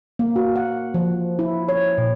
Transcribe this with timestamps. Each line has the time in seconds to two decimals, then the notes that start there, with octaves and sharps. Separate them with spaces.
0.19 A#3
0.36 F#4
0.56 F#5
0.94 F3
1.39 E4
1.69 C#5
1.98 A#2